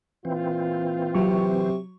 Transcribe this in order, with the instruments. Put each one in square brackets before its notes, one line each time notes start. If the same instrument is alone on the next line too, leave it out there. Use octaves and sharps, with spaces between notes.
[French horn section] A#2 F4 [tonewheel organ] E3 C4
[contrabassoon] C3 [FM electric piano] F#3 C#6